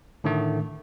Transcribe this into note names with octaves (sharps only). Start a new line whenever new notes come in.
A2 D3 D#3 A3